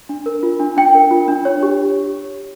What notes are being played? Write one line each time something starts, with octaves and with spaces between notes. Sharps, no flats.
D4
A#4
F4
D4
D4 G5
A#4
F4
D4
C#5
G4